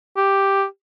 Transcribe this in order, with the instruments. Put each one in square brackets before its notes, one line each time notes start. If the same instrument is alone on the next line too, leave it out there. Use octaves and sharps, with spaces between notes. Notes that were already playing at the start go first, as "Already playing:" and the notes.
[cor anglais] G4